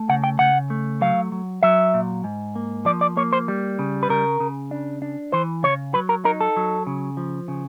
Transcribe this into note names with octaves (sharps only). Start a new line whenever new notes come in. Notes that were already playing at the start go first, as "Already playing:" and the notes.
Already playing: A3
C#3 F#5
G5
C#3 F#5
A3
F#3 F5
F#3
F#3 E5
A#2
G#2
A#3
F3 D5
D5
A#3 C#5
C5
G3
C#3
B4
C#3 A#4
C#3
D4
D4
E3 C5
C#3 C#5
F#3 B4
A#4
D#4 A#4
A4
F#3
C#3
F3
C#3